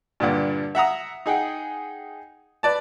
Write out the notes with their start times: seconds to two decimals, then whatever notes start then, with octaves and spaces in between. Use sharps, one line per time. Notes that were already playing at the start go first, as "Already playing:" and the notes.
0.20 G2 A#2 D3
0.75 E5 F#5 A#5 D#6
1.26 D#4 G#4 F#5 G5
2.63 B4 D5 A5